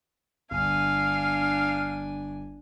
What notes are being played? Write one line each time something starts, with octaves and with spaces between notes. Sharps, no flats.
G1 D4 F5 G#5